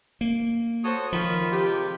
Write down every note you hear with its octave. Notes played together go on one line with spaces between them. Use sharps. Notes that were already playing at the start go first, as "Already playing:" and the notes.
A#3
F#4 A4 C5 C#5 D#6
D#3 F3 F4 B5
C3 G#3 G4